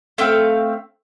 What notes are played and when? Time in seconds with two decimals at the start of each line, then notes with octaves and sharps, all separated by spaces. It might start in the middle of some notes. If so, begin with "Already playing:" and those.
0.18 A3 C4 F5 G5